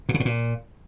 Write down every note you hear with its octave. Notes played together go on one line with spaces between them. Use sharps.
A#2
C#3
A2
A#2